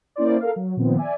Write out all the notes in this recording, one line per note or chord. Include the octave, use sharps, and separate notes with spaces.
A#3 C#4 E4 C5 D5
A4 A#4 F5
F#3
A#2 D#3 F3 B3 C4
D5 E5 G#5